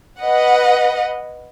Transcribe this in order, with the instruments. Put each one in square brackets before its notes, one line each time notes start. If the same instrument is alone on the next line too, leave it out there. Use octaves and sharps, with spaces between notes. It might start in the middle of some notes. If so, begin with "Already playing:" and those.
[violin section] B4 D#5 F#5